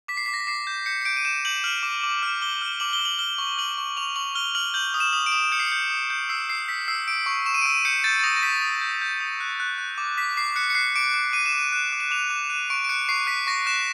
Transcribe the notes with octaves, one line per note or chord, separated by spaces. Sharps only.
D6 B6
C7
D6 B6
A#6
B6
D6 C7
G6
G6 C#7
C#7
G6 D7
D#7
G6 E7
G6 F#7
F6 F#7
D6
D6
F6
D6 G7
F6
D6 F#7
G7
F6
F#7
F6 G7
C#6
F6 F#7
C#6
C#6 F7
C#6 F#7
F6 G7
F6 F#7
G6 F#7
D#6
E7
D#6
D7
D#6
G6 C#7
C7
C#7
G6
D#6
G6
E6 C7
E6 C7
E6 B6
E6 C7
E6 D7
C#6
C#6 E7
D#7
D7
E6 D#7
G6 C#7
G6 A6
A6
D#6 A#6
A#6
G6 B6
D#6
G6
G6
D#6
F#6
F#6
F#6
D6
D6 B6
D6 C7
F#6 C#7
C#7
F#6 C7
D6 D7
D6
D6 D#7
E7
D6
D#7
F#6
D6
E7
D6 F7
D6
F#6 D#7
C#6 D7
D7
F#6 C#7
C#6 C7
F#6 B6
C#6 A#6
F#6 E7